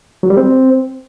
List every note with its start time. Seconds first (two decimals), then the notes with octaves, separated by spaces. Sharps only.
0.23 F#3
0.30 G3
0.37 C4